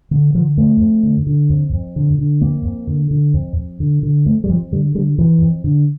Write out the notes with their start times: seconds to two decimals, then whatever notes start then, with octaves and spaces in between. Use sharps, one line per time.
0.11 D3
0.34 D3 F3
0.57 F2 A3
0.80 F2
1.03 D3
1.27 D3
1.50 F2
1.73 F2
1.96 D3
2.19 D3
2.41 F2 A#3
2.65 F2
2.87 D3
3.11 D3
3.34 F2
3.57 F2
3.80 D3
4.03 D3
4.26 F2 A3
4.44 G3
4.49 F2 F3
4.72 D3 G3
4.95 D3 G3
5.18 F2 E3
5.41 F2
5.64 D3